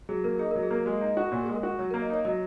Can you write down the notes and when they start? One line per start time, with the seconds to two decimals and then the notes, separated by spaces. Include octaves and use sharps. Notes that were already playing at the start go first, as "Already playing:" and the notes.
0.09 F#3 G#4
0.24 A#3 A#4
0.39 D#4 G#4
0.51 F#3 A#4
0.63 G#4
0.71 A#3 A#4
0.86 G#3
1.01 D#4
1.17 F#4
1.32 A#2 C#5
1.43 G#3 G#4
1.55 A#4
1.63 F#4
1.79 F#3 C#5
1.91 A#3 A#4
2.02 D#5
2.10 D#4 C#5
2.25 F#3 D#5